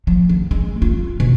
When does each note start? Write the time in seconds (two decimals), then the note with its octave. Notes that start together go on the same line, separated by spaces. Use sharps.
0.07 F3
0.29 D#3
0.51 G#3
0.82 F4
1.20 B2